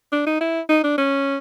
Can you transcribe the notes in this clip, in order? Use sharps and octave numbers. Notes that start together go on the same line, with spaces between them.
D4
D#4
E4
D#4
D4
C#4